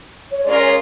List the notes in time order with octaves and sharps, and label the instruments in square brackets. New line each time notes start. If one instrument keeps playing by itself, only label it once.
[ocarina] C#5
[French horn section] G#3 C#4 F4 A#4 [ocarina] D5
[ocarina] C#5